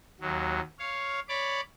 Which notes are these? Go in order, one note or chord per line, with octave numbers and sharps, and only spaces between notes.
D#2 F#3
C#5 F5
C#5 D5 B5 D6